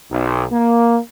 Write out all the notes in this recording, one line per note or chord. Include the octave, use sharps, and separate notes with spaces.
B1
A#3